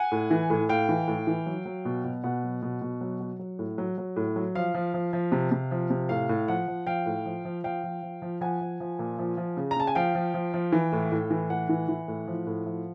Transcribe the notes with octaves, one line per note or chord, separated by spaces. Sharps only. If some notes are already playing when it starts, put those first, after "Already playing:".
Already playing: F#5 G#5
A2
E3
A2
A2 F5 G5
E3
A2
E3
F#3
F#3
B2
B2
B2 F#5
F#3
B2
B2
F#3
F#3
F#3
A2
F#3
F#3
A2
F#3
F3 F5
F3
F3
F3
C3
C3
F3
C3
A2 F5
A2
F3 F#5
F3
F3 F5 G5
A2
F3
F3
F3 F5 G5
F3
F3
F3
F3 F#5 G#5
F3
F3
A#2
F3
F3
C#3
A#5
C#3 A5
G#5
F3 F5 G5
F3
F3
F3
E3
A2
A2
E3
A2 F#5
E3
E3
A2
F3
A2
F3